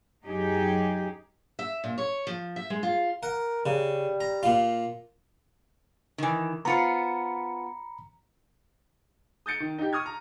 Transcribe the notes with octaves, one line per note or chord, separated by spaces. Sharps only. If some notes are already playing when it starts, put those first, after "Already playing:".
F#2 D#4 G4 G#4
E5
A#2
C#5
F3
E5
G#3
F4
A#4 F#5
C#3 G3
A#5
A#2 F4
D#3 E3
B3 F4 C5 A#5 B5 C#7
D#6 G6 A6 C#7 D7
D#3
D#4 G4
C#6 D#6 F6 G#6
A#5